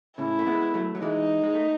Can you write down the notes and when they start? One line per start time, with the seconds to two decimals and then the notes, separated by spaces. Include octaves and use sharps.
0.18 A2 C#3 E4
0.39 A3
0.47 G#3 B3
0.74 F#3 A3
0.95 F#3
1.02 E3 G#3 D#4
1.43 G#3
1.55 A3